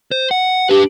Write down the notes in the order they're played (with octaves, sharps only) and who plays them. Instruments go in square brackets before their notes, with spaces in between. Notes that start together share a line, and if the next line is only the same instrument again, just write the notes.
[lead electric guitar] C5
F#5
[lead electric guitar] D4 B4 [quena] G4